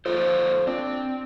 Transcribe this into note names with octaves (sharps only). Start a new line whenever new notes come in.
F3 A#3 A4 C5
C4 D4